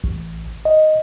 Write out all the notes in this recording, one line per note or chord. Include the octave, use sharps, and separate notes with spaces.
A1
D#5